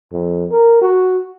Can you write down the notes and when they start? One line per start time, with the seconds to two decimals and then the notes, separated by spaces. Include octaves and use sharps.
0.12 F2
0.51 A#4
0.82 F#4